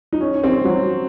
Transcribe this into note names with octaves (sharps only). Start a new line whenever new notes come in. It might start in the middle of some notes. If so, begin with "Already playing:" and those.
D#4
C#4
C4
F#3